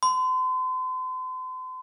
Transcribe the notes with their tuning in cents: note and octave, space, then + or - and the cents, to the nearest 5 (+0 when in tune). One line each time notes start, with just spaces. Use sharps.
C6 -40